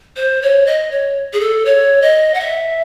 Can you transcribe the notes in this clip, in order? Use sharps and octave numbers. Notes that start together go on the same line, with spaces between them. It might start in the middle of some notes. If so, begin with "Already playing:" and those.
C5
C#5
D#5
C#5
G#4
A4
C#5
D#5
F#5
E5